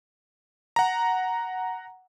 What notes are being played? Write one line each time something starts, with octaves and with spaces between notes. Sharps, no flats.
F#5 A#5